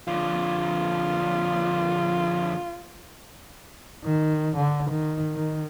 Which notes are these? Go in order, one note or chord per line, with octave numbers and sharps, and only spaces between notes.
F2 D3 F4
D#3
D3
D#3
D#3